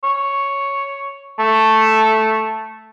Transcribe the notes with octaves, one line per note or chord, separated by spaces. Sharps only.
C#5
A3